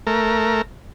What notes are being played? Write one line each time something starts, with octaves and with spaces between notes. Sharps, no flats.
A3 A#4